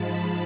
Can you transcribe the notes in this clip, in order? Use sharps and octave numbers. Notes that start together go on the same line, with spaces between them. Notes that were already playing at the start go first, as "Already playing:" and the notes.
Already playing: G#2 F3 G#3 A5 B5